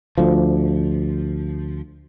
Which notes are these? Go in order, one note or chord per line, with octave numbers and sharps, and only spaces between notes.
D2 F3